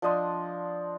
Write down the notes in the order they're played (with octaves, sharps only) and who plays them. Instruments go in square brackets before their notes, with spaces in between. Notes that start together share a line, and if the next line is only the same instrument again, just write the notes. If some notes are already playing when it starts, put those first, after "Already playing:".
[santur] F3 D4 D#5 C6